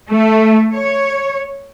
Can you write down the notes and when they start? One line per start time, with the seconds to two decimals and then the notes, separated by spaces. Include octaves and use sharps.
0.11 A3
0.73 C#5